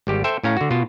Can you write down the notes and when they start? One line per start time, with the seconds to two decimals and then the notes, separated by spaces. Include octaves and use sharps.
0.07 G#1 G3 G4
0.24 A4 C5 E5 G5
0.43 A2 C#4 F5 A#5
0.57 D3 F#4
0.70 B2 F4